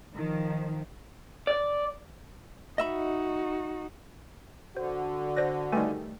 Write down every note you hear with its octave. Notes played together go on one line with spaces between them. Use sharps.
D#3 F3
D5
D#4 F#4 D#5 E5 B5
D3 F#4 C5
C5 D5 F#6 A#6
D#3 G3 A3 B4 G#5